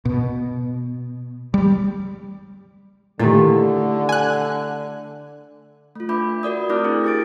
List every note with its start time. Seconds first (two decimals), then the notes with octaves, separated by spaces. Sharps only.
0.05 B2
1.54 G3
3.20 A#2 D3 D#3 A3 E4 G4
4.09 G#5 F#6
5.96 A3 F4
6.09 D4 B4 E5 B5 D6 G6
6.43 F#4 A#4 D5 D#6
6.69 A3 C4 E4 D6 F6 G6
6.84 C4 D4 G#4 A#4
7.04 G4 G#4 A6 D7